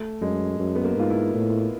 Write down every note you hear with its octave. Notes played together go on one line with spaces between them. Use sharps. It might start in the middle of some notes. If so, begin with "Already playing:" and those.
Already playing: A3
F#2 G#3
F#2
B3
A#3
G#2 F4
E4
A2